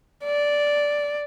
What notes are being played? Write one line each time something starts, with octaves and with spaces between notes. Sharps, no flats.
D5